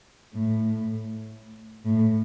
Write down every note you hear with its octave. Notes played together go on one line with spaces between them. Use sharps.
A2
A2